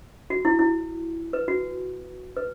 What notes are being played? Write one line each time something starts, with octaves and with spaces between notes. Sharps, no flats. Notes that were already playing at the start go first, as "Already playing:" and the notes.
F#4
E4
E4
B4
F#4
B4